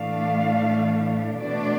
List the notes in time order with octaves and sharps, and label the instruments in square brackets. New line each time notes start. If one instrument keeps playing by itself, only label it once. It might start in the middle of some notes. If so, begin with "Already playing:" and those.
Already playing: [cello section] A2 E3 A3 D4 F5
B2 A3 D4 D5